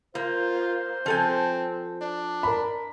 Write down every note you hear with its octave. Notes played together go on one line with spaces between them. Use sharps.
A#3 F4 C5
F3 C4 A4 G#5
D4
A#4 B5